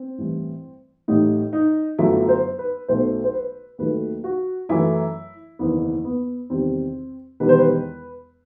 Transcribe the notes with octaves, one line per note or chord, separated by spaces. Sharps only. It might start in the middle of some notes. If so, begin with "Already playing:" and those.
Already playing: C4
A1 G2 E3
A1 A2 G3 D#4
D#4
G1 F#2 F#3 A3 E4
C5
B4
B1 B2 A3 C5
C5
B4
D#2 D#3 F#3 A3 B4
F#4
F#2 E3 A3 E4
F#1 E2 D#3 B3
B3
E2 C3 D#3 G3 C4
E1 E2 D#3 G3 B4
C5
B4